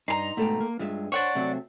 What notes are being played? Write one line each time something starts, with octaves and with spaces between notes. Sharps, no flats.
G2 D#4 A#5 C6
G#2 B2 A3 A4 G5
A#3
G2 G#3 F4 E5
D4 C5 C#5 F#5 C#6
C3 F#3 A3 C4